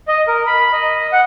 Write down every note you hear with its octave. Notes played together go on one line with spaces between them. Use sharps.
D#5
A#4
B5
D#5
F#5